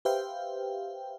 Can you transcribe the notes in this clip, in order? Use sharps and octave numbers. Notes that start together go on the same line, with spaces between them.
G4 B4 C5 E5 F5 G5